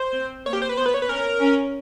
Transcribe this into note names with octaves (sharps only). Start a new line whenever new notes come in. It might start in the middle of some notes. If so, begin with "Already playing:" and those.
Already playing: C5
C4
A#3 C#5
G4
C5
B4
B3 C5
B4
C#5
B4
C#4 A#4
C#4